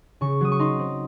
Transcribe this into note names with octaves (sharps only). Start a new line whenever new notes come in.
C#3 C#6
F#3 D#6
C#6
D#4 C6
C4